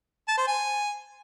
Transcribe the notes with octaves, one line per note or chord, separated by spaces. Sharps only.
A5
C5
G#5